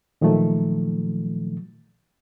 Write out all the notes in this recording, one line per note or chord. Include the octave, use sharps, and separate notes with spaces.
A#2 D#3 F3 F#3 A3